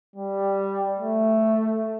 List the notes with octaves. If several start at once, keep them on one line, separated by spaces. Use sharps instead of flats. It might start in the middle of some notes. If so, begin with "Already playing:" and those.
G3
A3